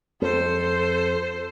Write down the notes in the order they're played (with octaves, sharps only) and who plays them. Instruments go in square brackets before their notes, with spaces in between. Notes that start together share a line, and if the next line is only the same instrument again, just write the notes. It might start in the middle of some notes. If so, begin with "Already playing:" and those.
[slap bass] F2 [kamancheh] A4 C5